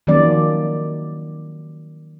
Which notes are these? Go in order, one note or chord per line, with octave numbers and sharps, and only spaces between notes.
D#3 F3 F#3 A#3 C#4 D5